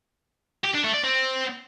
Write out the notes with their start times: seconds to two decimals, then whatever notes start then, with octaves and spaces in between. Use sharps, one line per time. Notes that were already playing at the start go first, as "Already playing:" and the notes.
0.64 G4
0.74 D4
0.84 A3
0.94 D5
1.03 C4